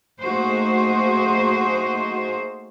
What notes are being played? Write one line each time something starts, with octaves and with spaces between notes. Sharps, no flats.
A3 A#3 D#4 F#4 G#4 C5